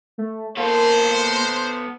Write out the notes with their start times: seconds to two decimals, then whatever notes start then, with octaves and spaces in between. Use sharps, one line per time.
0.18 A3
0.57 A#3 B3 A4 C5